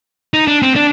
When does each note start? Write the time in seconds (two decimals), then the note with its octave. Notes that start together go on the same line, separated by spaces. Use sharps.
0.34 D#4
0.48 D4
0.62 C4
0.76 D4